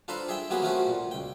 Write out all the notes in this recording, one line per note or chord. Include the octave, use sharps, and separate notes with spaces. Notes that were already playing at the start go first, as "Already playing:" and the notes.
D4 F4 A4 B4 C5 A#5
G#4 E5 G5
F#3 A#3 C4 G4 G#4 B4
F3 A3 C4 C#4 F#4 A#4
A#2
C#2 G5